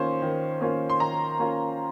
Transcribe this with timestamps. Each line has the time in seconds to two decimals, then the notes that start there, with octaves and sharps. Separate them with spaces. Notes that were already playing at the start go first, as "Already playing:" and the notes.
Already playing: D#3 A#3 C#4 F4 C5
0.22 D#3
0.61 A#3 C#4 F4
0.90 C6
1.00 D#3 A#5
1.39 A#3 C#4 F4